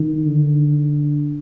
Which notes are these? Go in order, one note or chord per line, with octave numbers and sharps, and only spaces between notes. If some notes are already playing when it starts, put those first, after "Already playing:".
Already playing: D#3
D3